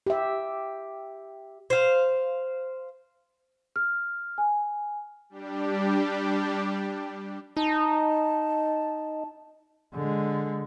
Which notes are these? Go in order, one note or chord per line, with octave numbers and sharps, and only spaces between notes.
G4 E5
C5 F5
F6
G#5
G3 D4 G4
D#4 A5
D3 G#3